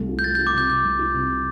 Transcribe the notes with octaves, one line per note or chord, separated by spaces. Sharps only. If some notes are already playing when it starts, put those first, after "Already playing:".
Already playing: C2 A3
F4
G6
A3 A6
F4 G6
D6
C3 G6
C3 G6
C2
F4
C3